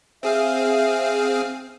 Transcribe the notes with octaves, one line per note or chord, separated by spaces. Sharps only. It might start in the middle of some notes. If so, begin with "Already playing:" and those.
C4 G#4 E5 F5